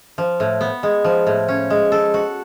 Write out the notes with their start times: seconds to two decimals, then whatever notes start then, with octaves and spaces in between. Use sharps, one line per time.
0.18 F3
0.40 A2
0.61 B3
0.83 G#3
1.04 F3
1.27 A2
1.48 C#4
1.70 G#3
1.92 A4
2.14 F#4